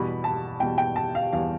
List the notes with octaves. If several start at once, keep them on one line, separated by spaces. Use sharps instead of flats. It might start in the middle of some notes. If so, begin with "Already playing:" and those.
Already playing: E2 B2 G3 B5
A5
E2 B2 G3 G5
G5
A5
F5
E2 B2 G3 F5